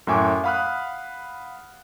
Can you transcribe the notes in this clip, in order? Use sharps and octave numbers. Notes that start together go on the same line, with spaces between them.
F#2 A2 E5 G#5 C#6 D6
F5 F#5 B5 D#6 F6 F#6